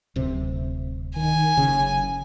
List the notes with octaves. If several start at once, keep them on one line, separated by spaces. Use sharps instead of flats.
D1 C3
D#3 G#5
F#1 C#3